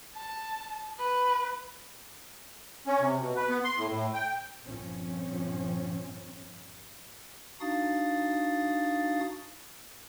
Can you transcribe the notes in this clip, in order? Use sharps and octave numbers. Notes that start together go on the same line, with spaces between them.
A5
B4
C#4
C3
B2
B4
B3
C6
A2
A2
G5
G1 A#2 F3 C4 C#4
D4 D#4 F#4 F5 D#6 A6